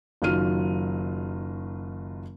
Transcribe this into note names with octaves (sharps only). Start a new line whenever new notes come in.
F#1 D#3 F#3 F4 F6 D#7